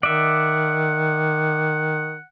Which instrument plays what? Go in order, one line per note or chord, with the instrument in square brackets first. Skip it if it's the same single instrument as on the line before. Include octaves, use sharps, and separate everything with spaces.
[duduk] D#3 [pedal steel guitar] D5 E5 [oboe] F#5